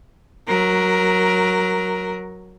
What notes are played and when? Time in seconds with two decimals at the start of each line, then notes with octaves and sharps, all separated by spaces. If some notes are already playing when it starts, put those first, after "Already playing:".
0.48 F#3 A#4